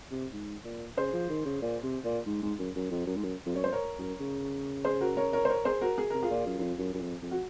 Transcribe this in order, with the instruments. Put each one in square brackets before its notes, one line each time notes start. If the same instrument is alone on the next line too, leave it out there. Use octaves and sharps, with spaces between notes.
[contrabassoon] C3
G#2
A#2
[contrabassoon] C#3 [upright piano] G#4 C5
[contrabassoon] F3
D#3
C#3
A#2
C3
A#2
G#2
G#2
F#2
F#2
F2
F#2
G#2
F#2
F2
[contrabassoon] F#2 [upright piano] C#5
[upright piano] C5
A#4 C#5
[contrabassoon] F#2
C#3
[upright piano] G#4 C5
F#4 A#4
A#4 C#5
A#4 C#5
C5
A#4 C#5
G#4 C5
F#4 A#4
G#4
[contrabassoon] C3 [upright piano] A#4
[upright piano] F4 G#4
[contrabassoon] A#2
F#2
F#2
F2
F#2
F#2
F2
F2
[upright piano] F#4